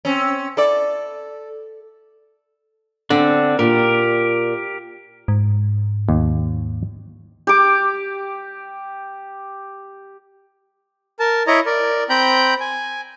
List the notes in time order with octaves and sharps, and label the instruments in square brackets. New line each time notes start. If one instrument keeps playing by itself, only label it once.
[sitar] C4 C#4
[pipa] E4 D5 [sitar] A4
[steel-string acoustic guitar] D3 [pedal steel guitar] C4 D4
[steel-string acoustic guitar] A#2 [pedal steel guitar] G4 A#4
[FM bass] G#2
[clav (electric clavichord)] D#2
[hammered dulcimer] G4 D6
[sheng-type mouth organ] A#4 A5
E4 C#5 D#5 A#5
A#4 D5
C4 G5 A#5 B5 G6
G#5